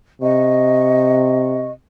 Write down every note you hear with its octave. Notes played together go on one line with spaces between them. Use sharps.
C3 D#5 C#6